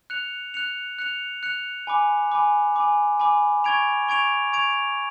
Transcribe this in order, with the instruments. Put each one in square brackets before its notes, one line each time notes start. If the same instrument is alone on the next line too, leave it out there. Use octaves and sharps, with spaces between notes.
[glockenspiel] F#6 C#7 F7
F#6 C#7 F7
F#6 C#7 F7
F#6 C#7 F7
G#5 B5 D6
G#5 B5 D6
G#5 B5 D6
G#5 B5 D6
C#6 G#6 D7 F7
C#6 G#6 D7 F7
C#6 G#6 D7 F7